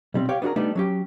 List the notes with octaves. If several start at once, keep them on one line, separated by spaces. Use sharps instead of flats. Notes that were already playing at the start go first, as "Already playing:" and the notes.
B1 G3 C4
G4 C#5 F5 G5
B3 D4 F#4 G#4 A#4
G3 A3 B3 D4 D#4
F#3 C#4 G4